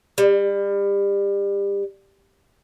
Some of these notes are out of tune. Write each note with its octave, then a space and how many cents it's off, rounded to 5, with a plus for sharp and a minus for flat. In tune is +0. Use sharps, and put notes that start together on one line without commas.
G3 +30